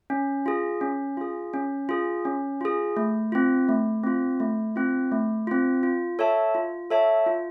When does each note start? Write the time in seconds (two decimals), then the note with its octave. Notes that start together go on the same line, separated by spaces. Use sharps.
0.10 C#4
0.46 F4 G#4
0.81 C#4
1.17 F4 G#4
1.54 C#4
1.89 F4 G#4
2.25 C#4
2.61 F4 G#4
2.97 A3
3.32 C4 F4
3.68 A3
4.04 C4 F4
4.40 A3
4.76 C4 F4
5.12 A3
5.47 C4 F4
5.83 F4
6.19 A4 C#5 E5 A5
6.55 F4
6.91 A4 C#5 E5 A5
7.26 F4